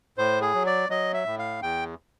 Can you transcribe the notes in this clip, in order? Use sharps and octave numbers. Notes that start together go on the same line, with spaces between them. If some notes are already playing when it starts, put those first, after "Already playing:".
A2 C5
G#4
F#3
D5
F#3 D#5
E5
A2
F5
E2 G5